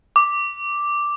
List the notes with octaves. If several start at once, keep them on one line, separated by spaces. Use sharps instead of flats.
D6